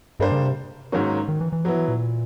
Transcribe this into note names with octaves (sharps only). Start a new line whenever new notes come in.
G2 G3 A#3 D4 G4 C5
C#3
C3
G#2 D#3 F#3 A#3 C#4
D#3
E3
E3
F3 F#3 B3 E4
E3
A#2